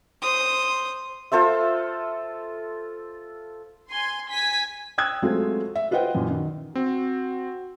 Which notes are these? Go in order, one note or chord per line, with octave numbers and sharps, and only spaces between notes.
C5 D#6
F4 A4 C5 E5
G#5 C6
G#5 B6
G5 D#6 E6 F#6 G#6
F#3 G#3 A3 C4 F4
E5
F4 B4 C5 D#5 F#5 G5
F#2 A#2 E3
D#3
C4 F#4